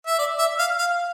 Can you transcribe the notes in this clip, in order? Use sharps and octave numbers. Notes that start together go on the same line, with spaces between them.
E5
D5
E5
F5
F5